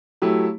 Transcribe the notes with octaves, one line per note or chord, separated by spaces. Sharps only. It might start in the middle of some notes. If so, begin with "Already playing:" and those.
F#3 A3 E4 G4